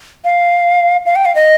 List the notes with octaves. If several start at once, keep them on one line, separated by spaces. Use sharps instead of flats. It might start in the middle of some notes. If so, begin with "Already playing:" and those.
F5
F5
G5
F5
D#5